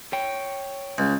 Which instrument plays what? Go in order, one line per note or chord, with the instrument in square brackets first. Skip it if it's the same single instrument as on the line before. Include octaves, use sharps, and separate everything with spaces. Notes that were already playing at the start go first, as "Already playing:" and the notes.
[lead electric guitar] C#5 G5
[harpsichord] C#2